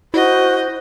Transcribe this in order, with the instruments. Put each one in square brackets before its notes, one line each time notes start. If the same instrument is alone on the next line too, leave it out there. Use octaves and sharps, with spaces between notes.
[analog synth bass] E4 [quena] F#4 [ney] C5 [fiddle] D#5